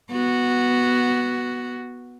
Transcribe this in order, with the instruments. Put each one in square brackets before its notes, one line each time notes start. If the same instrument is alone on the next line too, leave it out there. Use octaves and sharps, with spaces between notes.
[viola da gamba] B3 F#4